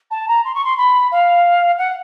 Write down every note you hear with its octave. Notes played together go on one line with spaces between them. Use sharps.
A5
A#5
C6
C#6
C6
B5
F5
F#5